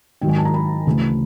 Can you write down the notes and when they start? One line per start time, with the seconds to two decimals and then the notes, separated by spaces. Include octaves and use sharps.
0.21 G#2 D#3 F#3 G5
0.29 G#5
0.38 A5
0.45 A#5
0.54 B5
0.87 D2 C#3 E3 A3